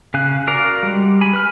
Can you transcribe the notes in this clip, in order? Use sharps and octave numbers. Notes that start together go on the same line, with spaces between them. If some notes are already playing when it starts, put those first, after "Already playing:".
C#3 F5 G#5 F#6
F#4 A#4 D5 F5 A#5
G3 G#3
G#5 B5
B4 B5 F6